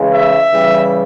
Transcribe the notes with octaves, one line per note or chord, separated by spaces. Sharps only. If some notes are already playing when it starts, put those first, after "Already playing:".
Already playing: C#3 E3 G#3
E5
C#3 E3 G3